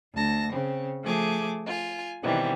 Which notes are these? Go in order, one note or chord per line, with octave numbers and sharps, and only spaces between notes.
D2 A5 A#6
C#3 C4
F3 A3 G#4 D6
F4 G#5
B2 D#3 E3 G3 C4